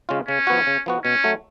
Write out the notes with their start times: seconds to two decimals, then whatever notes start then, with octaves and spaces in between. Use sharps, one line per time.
0.09 C#3 G#3 C#4 F4
0.28 C#3 C#4
0.47 F3 B3 F#4
0.67 C#3
0.86 F3 B3 F#4
1.04 B2 C#4
1.24 F#3 A3